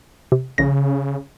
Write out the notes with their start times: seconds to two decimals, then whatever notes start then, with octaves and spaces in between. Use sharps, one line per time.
0.32 C3
0.58 A#1 C#3 A#6